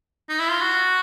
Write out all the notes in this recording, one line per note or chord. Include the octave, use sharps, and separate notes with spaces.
D#4
E4
F4
F#4